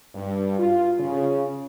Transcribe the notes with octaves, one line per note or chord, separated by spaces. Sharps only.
G2
F4
C#3